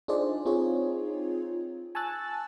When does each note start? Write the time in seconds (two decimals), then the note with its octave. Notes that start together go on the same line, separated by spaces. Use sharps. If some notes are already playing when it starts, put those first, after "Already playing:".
0.08 D4 D#4 F4 G#4 C5 D5
0.45 C4 D#4 F4 G#4 C#5
1.95 G#5 A5 C#6 E6 F#6 A6